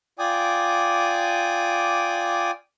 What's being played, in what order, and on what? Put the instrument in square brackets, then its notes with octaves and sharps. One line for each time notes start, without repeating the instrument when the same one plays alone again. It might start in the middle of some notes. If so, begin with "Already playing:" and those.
[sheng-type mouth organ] F4 D5 G5 G#5 D6 D#6